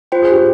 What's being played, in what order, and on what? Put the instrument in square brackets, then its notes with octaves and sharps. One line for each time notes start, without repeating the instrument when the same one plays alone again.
[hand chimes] F4 C5 G5
[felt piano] G#4
G4